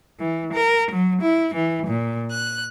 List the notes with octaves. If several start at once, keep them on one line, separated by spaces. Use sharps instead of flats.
E3
A#4
F#3
E4
E3
A#2
F#6